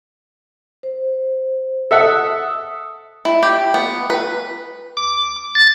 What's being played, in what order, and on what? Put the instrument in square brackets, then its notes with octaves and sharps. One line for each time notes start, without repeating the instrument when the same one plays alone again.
[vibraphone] C5
[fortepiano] A4 E5 F#5 [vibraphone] D#6
[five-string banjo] E4
G4
B3
B4
[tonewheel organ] D6
A6